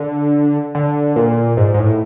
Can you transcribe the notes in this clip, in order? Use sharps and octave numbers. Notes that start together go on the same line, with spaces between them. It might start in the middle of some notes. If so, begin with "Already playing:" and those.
Already playing: D3
D3
A#2
G#2
G#2
A2